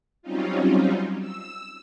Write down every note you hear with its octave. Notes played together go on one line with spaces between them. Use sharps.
F#3 G3 C4 C#4 D#4 F4
E6